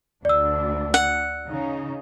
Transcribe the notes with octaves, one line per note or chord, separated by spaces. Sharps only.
D2 D4 D5 E6
F#5
C#3 D#4